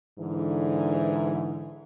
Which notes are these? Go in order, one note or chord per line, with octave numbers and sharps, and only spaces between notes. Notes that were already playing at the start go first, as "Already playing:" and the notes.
G#2 D3 E3